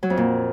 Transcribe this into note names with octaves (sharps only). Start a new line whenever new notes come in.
F#3
F2
A#2